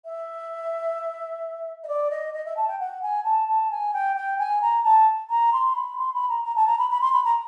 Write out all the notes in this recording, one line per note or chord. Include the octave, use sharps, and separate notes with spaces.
E5
D#5
D5
D#5
D#5
E5
A5
G5
F#5
G#5
A5
A5
G#5
G5
G5
G#5
A#5
A5
A#5
C6
B5
C6
B5
A#5
A#5
A5
A#5
B5
B5
C6
B5
A#5